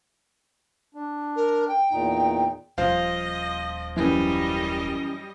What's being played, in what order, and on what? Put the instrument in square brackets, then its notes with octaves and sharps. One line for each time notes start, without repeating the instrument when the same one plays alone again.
[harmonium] D4
[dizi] A#4
G5
[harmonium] E2 A#2 D#4
[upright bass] D#1 [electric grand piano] F3 C5 F5 [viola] D#5
[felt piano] F#2 E3 [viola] G3 D#5